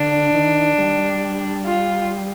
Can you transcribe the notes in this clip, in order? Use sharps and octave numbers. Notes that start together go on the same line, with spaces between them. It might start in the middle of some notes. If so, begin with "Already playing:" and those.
Already playing: D3 D4
D#3
G3
F4